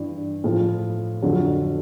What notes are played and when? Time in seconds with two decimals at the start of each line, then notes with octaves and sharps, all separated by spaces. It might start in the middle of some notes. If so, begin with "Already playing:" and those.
Already playing: G2 E3
0.44 A2 F3
1.22 F2 D3 F#3